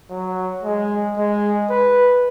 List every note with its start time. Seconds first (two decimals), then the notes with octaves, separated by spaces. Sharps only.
0.10 F#3
0.63 G#3
1.17 G#3
1.70 B4